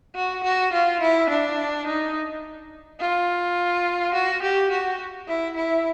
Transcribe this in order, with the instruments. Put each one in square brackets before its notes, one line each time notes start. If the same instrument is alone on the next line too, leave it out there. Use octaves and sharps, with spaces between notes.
[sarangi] F#4
F#4
F4
E4
D4
D#4
F4
F#4
G4
F#4
E4
E4